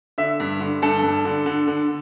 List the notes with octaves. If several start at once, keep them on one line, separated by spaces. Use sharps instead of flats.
D3 E5
G2
D3
G2 A4
G2
D3
D3
D3